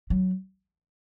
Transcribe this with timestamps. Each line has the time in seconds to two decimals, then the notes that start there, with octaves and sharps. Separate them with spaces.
0.10 F#3